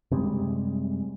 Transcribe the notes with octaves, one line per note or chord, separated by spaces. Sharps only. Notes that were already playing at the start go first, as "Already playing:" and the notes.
F#2 C3 G3 G#3